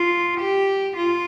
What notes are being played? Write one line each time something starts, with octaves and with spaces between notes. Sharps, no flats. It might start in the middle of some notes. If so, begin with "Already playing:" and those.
Already playing: F4
G4
F4